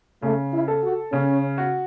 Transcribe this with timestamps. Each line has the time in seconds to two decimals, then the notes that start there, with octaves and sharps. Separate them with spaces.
0.22 C#3 A3
0.52 E4
0.68 A4
0.82 F#4
1.12 C#3 C#4
1.58 F#4